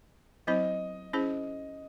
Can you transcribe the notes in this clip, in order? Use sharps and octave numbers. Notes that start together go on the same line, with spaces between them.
F#3 C4 E4 C5 D#5
C#4 E4 G#4 C5